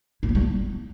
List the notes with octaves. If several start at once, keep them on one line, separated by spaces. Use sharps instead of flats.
E4
B3
G3
E4